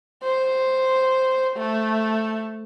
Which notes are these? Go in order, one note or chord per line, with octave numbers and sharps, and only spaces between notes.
C5
A3